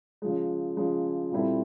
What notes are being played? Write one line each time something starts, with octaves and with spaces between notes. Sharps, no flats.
C#3 F3 G#3
C#3 F3 G#3
A#2 G3 C4 E4 A4